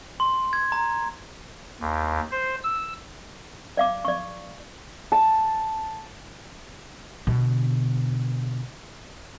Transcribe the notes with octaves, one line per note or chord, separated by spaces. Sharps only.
C6
G#6
A#5
D#2
C5
E6
D5 F5 D6
D5 C#6
A5
B2 D3